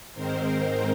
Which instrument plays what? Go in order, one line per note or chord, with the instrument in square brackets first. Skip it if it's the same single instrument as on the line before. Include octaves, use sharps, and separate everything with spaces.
[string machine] G#2 D#3 G#3 C4 A#4 C5